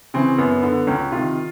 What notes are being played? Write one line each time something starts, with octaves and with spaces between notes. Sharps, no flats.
C#3 E3 C4
F#2 B3
D3
C#2 C#4
C3 D#3 F4